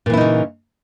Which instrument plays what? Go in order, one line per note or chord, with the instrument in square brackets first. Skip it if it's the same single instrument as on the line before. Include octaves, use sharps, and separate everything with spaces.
[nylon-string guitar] A#2
E3
E4
D#4
C#3